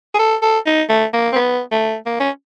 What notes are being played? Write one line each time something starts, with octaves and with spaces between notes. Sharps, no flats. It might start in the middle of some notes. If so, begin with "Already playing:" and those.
G#4
A4
A4
D#4
A3
A#3
C4
B3
A3
A#3
C#4